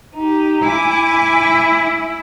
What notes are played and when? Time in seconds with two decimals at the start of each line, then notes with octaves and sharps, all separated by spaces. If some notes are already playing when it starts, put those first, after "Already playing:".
0.15 D#4 G4
0.64 E4 G#5 D6